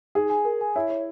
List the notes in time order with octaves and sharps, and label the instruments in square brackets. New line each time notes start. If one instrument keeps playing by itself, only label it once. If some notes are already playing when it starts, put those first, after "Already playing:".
[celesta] D#4 [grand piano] G#4
[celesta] G#5
A#4
G#5
[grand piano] E4 [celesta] C#5
[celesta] C#5